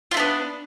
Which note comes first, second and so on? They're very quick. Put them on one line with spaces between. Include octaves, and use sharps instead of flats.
F4 A3 D4 B3